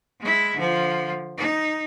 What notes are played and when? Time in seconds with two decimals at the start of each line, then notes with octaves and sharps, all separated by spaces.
0.20 G#3 E4
0.56 D3 F3
1.38 D#4